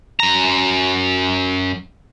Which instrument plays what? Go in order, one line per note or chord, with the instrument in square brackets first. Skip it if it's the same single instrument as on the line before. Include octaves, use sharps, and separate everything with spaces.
[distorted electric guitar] F#2 A#5